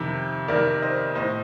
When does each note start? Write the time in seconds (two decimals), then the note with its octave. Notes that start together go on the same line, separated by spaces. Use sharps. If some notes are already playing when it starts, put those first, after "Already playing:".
Already playing: F2 C3 D#3 C5
0.48 F2 C3 D#3 A#4 D5
0.82 C5 D#5
1.15 A2 C5 D#5